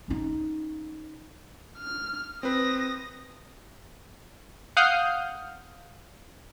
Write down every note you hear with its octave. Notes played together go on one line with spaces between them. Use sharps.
C#4 D#4
F6
C4 B4 D#6 A#6
F5 F#5 D#6 F6 G6